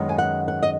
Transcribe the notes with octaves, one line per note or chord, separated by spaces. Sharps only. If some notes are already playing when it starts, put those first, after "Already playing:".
Already playing: F#2 D#3 G#3 B3
G#5
F#5
F#5
D#5